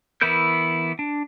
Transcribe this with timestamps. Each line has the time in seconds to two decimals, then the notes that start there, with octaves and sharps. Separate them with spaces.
0.21 E3 B3 E4 A#4 G6
0.99 D4